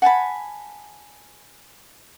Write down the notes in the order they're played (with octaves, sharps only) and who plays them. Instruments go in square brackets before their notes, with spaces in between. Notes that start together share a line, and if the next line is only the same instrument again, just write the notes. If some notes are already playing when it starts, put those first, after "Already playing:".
[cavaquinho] F#5 G#5 A5 B5